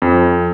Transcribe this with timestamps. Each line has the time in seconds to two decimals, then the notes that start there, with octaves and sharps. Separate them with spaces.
0.02 F2